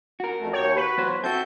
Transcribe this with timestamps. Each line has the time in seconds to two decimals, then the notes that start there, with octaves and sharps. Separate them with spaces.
0.20 F#4 A#4
0.39 F2 A3
0.53 D#2 C#5 G5
0.76 F#4 B4
0.98 E2 F#3 C5
1.24 C4 F#4 A4 E5 A5 G6